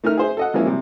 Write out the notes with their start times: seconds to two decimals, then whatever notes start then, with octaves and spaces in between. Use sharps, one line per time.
0.04 A3 D#4 A#4 E5 F6
0.17 G#4 C5 E5
0.37 A4 D#5 F#5
0.54 E3 F3 G#3 A#3 C#4 E4
0.66 C3 G3